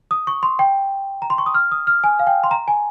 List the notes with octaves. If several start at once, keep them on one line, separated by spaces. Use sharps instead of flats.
D#6
C#6
C6
G5
A#5
C6
C#6
D#6
F6
D#6
F6
G#5
F5
G5
C6
A#5
G#5